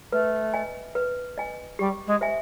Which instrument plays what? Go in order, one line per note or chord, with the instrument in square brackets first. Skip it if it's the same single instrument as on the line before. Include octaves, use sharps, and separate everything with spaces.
[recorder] A3 [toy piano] B4
[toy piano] D#5 G#5
B4
D#5 G#5
[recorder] G3 [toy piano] G4
[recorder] G#3
[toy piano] C5 E5 G#5